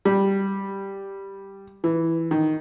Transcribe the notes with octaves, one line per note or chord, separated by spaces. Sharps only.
G3
E3
D#3